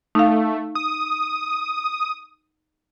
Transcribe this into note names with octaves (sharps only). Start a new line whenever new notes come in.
A3 D#4 F5
D#6